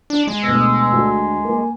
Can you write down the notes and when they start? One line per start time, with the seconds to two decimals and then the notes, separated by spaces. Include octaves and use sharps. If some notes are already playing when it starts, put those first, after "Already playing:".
0.10 D4
0.27 G#3
0.43 D2 B2 E6
0.92 D2 D4 F#4
1.45 A#3 G#5